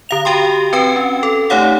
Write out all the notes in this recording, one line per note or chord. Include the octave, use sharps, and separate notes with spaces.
D3 F5 F7
F#4 G4 G5 C6
C4 B4 G5
C#4
A4
A3 D#4 G4 C#5 F5 F#5